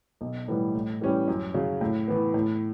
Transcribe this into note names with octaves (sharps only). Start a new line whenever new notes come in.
B1
A2 E3 G3 B3
A2
E3 G3 C#4 G4
F#2
C#3 F#3
A2
E3 B3
A2